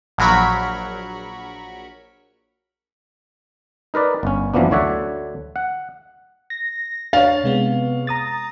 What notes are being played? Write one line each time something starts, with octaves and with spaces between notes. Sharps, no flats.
A#1 F#3 A#4 B5 C#6
D#4 A#4 B4 D5
G1 C#4
F#2 E3 F3 A#3 B3 D4
D2 D3 C#5 D5 E5 F#5
F#5
A#6
D4 C#5 F5 A6
C3 G#3 B3
A#5 D#6 A6